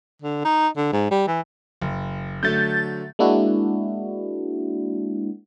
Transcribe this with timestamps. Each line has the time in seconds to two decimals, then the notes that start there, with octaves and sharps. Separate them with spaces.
0.22 D3
0.45 D#4
0.77 D3
0.93 G#2
1.11 G3
1.27 E3
1.81 F#1
2.43 D3 F#3 A3 G6 A6
3.19 G#3 A#3 D4 E4 F#4